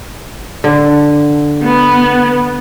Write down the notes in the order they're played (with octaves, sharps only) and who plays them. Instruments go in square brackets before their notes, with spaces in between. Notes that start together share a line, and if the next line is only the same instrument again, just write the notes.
[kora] D3
[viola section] B3